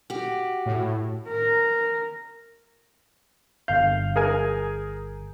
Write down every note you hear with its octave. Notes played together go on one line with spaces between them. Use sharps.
F#4 G4
A2
A#4
G1 F5 G6
G#4 A#4 G#5